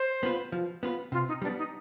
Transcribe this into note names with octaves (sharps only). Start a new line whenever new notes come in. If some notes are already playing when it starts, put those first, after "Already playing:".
Already playing: C5
B3 F4 B4
F3
B3 F4 B4
C3 F4
D#4
G3 B3 D4
D#4